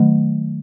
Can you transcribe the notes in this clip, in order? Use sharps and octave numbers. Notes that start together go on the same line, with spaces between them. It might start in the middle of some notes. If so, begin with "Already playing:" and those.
Already playing: D#3 F#3 A3